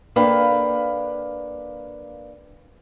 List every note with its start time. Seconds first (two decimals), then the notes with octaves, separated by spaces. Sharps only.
0.16 A#3 D4 A4 B4 F5 G5